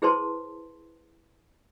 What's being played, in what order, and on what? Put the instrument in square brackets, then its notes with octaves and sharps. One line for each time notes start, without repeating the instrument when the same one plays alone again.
[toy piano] E4 G#4 B4 C5 A5 C6